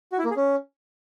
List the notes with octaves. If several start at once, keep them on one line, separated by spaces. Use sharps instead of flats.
F#4
E4
A#3
G#4
C#4